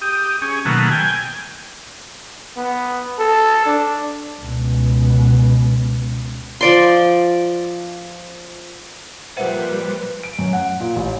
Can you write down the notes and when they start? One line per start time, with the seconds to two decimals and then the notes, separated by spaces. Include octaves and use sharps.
0.01 G4 D#6
0.42 C#4 G#4
0.65 B2 D#3 F#3 A3 A#3
0.91 G5 G#5
2.57 B3
3.19 A4
3.66 D4
4.41 C#2 B2
6.61 F3 D5 C6
9.37 A#2 F3 G3 B4 C5 E5 F#5
10.23 D7
10.39 F#2
10.53 F#5
10.80 A#2
10.96 A1